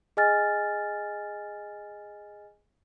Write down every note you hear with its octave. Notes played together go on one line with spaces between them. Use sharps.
G#4 D#5 G#5 F6 A6